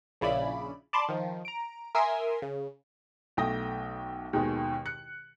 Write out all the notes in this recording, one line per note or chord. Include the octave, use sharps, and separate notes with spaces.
A#1 C#3 E4 D5 B5
D5 A5 B5 C6 D6
D#3 F3
A#5 D7
A#4 E5 G#5 C6 D#6 E6
C#3
B1 A3 G5 D#6 A#6
D#2 B2 D#3 G#3
F#6 C#7